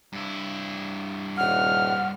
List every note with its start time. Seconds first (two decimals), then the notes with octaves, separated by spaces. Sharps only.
0.13 G2 E4
1.37 D#1 F#5 F6